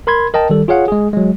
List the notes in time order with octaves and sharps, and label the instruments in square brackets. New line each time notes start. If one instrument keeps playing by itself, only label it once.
[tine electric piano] A#4 B5 C6 G#6
A#4 D#5 G5 A5
D#3 G3 A4
F4 G#4 C#5 F5 F#5
G#3 G#4
F#3 G#3